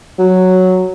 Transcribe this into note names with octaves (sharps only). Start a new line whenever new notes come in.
F#3